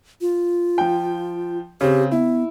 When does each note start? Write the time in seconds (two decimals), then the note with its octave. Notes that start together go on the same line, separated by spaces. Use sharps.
0.21 F4
0.78 F3 G5
1.81 C#3 C4 G4
2.12 B3 E4